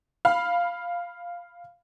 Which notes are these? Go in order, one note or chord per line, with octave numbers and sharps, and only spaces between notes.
F5 B5